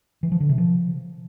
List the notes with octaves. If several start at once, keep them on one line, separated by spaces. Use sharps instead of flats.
E3
F3
D3
C3
F3